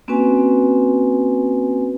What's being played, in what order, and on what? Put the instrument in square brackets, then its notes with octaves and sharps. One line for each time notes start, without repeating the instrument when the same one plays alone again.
[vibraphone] A#3 C4 C#4 F#4 B4 G#5